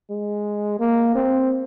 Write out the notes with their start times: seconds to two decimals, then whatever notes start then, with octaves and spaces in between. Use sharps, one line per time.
0.10 G#3
0.80 A#3
1.15 C4